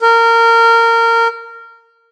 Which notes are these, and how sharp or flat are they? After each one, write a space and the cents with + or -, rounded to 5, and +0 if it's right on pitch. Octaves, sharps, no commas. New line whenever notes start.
A#4 -20